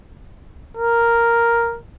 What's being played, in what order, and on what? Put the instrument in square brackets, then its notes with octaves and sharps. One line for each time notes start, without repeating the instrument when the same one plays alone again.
[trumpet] A#4